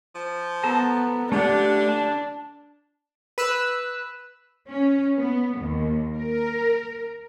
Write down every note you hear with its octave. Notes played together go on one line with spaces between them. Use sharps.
F3
B3 A4 A5 A#5
D3 A3 D4 G4 F#5
A5
B4 E6 F#6
C#4
B3
D#2
A#4